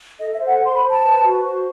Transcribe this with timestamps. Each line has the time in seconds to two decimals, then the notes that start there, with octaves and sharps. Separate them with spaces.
0.19 A4 D#5
0.33 E5
0.39 C5
0.47 F#5
0.61 C5 C6
0.74 B5
0.81 C5
0.89 A5
1.03 B4
1.23 F#4
1.43 C5